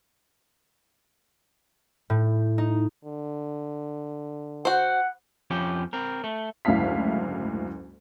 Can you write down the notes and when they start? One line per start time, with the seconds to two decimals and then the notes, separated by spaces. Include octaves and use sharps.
2.10 A2
2.58 D#4
3.05 D3
4.65 F#4 C5 F#5
5.51 F2 F3 C#4 G4
5.93 C4 A#4
6.24 A3
6.65 F#1 D2 G#2 E4 F5 B6